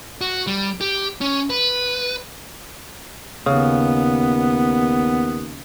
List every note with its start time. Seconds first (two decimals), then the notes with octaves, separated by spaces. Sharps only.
0.21 F#4
0.47 G3
0.81 G4
1.21 C#4
1.50 B4
3.46 D#2 C#3 B3